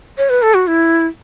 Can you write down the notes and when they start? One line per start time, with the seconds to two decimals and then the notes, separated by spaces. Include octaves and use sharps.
0.18 C#5
0.30 B4
0.42 A4
0.54 F#4
0.67 E4